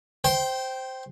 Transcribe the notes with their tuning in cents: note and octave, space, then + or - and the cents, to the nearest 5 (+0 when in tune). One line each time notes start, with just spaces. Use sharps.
C5 +0 G5 -15